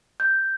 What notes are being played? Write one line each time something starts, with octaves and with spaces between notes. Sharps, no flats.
G6